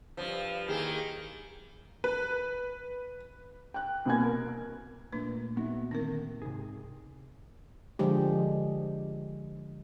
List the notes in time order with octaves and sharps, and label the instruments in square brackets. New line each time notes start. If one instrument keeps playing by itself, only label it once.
[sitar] G2 F3
[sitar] D#3 A#3 [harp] E4 G4 G#4
[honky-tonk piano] B4
[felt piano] G5 F#6
C2 B2 A#3 G#5 G#6
A#4
[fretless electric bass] A#2 A3 A#3 [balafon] D4 B4
[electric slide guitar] B3 F#4 E5 [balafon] D#4
[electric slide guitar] D3 D#3 [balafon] C4 D#4 A#4
[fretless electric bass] G#2 [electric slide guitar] C3 G#4
[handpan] D3 F3 G#3 G4